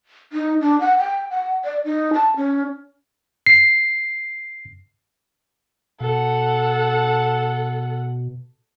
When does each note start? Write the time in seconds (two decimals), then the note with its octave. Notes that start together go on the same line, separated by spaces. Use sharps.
0.33 D#4
0.61 D4
0.81 F#5
0.99 G5
1.30 F#5
1.64 D5
1.85 D#4
2.14 A5
2.37 C#4
3.46 C7
6.00 B2 A4 F#5